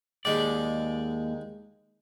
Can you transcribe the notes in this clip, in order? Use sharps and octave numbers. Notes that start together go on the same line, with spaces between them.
D#2 G#3 D5 G5